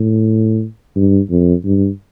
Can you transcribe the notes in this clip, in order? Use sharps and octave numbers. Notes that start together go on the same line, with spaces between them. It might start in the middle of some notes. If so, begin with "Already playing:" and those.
Already playing: A2
G2
F2
G2